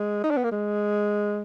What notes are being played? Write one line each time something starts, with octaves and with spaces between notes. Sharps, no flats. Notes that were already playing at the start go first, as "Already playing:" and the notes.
Already playing: G#3
D#4
D4
B3
A#3
G#3